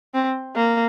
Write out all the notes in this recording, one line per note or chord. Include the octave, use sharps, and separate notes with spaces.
C4
A#3